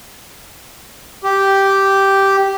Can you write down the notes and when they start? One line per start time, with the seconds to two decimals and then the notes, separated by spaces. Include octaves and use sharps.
1.24 G4